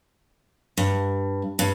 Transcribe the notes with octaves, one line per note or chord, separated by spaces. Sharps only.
G2
G2